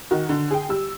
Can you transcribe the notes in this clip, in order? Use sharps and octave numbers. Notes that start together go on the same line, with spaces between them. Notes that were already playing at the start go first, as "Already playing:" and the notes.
D#3 F#4
D3
G#4 G5
G3 E6